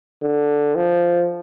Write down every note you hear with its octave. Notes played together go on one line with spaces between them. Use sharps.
D3
F3